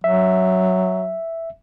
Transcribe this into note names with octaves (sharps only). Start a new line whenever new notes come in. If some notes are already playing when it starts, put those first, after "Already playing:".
F#3 E5